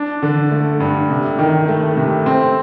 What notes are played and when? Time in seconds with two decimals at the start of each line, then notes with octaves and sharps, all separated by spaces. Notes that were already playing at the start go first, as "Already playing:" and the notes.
Already playing: D4
0.22 D3
0.51 A3
0.80 G2
1.10 C3
1.39 D#3
1.68 A3
1.97 C3
2.26 C4